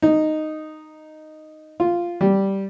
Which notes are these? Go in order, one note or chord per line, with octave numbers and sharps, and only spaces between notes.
D#4
F4
G3